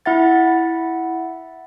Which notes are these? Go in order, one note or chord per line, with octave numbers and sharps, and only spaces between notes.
E4 E5 F#5 A6